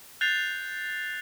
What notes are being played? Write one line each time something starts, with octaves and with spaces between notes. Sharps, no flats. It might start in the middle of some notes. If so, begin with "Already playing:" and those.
F#6 G6 A6 C7 F7